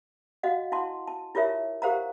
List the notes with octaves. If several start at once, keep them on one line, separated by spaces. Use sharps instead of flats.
F#4 D#5 F5 F#5
E4 F#5 A5 C6
A5
E4 F4 G4 A#4 C#5 E5
G4 A#4 C5 F5 F#5 A#5